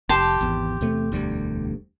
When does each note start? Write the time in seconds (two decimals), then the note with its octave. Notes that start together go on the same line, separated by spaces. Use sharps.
0.09 F1 G4 A5 C6
0.41 G#1 E2
0.81 E2 C3 A3
1.12 E1 D2 G3